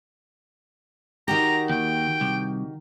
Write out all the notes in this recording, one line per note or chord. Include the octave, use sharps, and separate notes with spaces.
D#3 F#4 G4 A#5
D#2 G5
C2